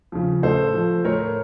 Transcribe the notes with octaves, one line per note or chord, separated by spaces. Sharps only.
C#3 F3
A2 A4 C5
F3
A2 A#4 C#5